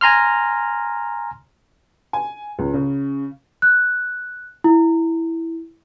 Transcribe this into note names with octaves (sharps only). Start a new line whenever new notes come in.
G#5 A#5 C6 F6
G#5
C#2
C#3
F#6
E4